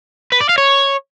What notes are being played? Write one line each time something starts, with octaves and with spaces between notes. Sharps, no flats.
B4
D5
F5
C#5